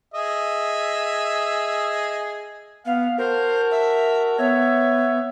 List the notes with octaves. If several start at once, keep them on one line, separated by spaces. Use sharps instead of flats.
G#4 D#5 E5
B3 F5
F#4 A#4 C5 A5
E5
B3 C#5 E5